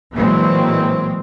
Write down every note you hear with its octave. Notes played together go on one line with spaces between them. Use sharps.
A#2 E3 F#3 G#3 A#3 C4